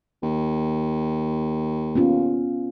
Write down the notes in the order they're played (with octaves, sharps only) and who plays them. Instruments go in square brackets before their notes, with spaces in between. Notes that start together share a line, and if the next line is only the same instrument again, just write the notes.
[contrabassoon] D#2
[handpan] B3 C#4 F4